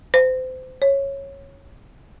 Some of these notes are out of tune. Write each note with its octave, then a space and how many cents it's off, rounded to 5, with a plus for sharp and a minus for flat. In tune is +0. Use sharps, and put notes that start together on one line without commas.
C5 -30
C#5 -10